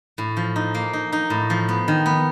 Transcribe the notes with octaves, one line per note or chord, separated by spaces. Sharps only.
A2
F3
D#4
A#3
D#4
D#4
A2
F3
B3
D#3
B3